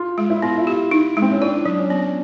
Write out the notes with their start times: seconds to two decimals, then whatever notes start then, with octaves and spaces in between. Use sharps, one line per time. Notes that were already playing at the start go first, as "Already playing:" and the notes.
Already playing: F4
0.18 G#3
0.30 E4
0.42 B3 F4
0.58 E4
0.67 G4
0.91 D#4
1.17 G#3
1.22 C4
1.31 C#4
1.41 D4 E4
1.66 F#3
1.78 C#4
1.90 B3